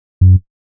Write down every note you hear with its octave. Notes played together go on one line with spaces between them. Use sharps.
F#2